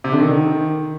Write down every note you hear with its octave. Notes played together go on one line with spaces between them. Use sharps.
C3
D3
D#3